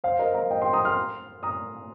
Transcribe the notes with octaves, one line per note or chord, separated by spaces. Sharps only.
C5 F5
A#4 D#5
F5 A#5
D#5 G5
G5 C6
A#5 D#6
C6 F6
A#5 D#6